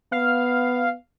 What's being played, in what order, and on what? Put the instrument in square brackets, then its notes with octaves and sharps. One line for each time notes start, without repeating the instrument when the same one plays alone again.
[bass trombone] B3 [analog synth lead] F5